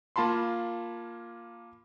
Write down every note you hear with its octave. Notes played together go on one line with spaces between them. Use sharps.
A#3 F4 A5 B5 C6